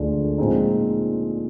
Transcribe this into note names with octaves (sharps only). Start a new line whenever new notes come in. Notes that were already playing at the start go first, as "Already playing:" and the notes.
Already playing: D2 D3 F3 G#3 D4
A#2 F3 G#3 C4 D#4